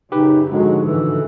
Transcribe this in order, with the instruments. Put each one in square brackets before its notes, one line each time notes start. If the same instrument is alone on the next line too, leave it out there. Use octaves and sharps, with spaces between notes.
[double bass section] F#2 C#3 [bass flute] D#4 [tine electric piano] G4 B4
[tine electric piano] G#2 D3 F3 [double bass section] F#3 G#3 [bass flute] F#4
[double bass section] A2 C#3 E3 [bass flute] A4